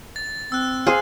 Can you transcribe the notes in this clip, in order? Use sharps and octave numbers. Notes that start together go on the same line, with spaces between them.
A6
C4 E6 F#6
G#4 C5 F5